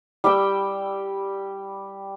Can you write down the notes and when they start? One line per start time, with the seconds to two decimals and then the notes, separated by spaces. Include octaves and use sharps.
0.24 G3 G4 G5 E6